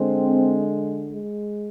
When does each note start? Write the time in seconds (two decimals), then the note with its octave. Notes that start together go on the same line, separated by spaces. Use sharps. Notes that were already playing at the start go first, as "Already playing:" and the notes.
Already playing: D3 G#3 C4
1.11 G#3